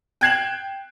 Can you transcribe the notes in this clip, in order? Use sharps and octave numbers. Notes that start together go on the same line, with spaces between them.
G5 F#6 G#6 C7 E7 F#7